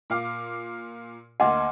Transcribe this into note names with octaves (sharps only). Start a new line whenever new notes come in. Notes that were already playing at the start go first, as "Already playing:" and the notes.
A#2 F5 D6
D2 A#3 D#5 F#5 G#5 C6 D6